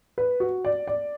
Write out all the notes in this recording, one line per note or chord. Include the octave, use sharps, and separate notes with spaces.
B4
F#4
D5
D5